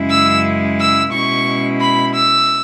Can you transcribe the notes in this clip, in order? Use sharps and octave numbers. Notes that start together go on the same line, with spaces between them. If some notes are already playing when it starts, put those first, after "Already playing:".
Already playing: F#2 C#3 G#3 E4
E6
E6
B2 G#3 C#4 E4 C#6
B5
E6